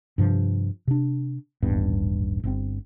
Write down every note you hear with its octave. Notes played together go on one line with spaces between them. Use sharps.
G2 C3 F3
C3 D4
D#1 A1 G2 B3
G1 C3 C4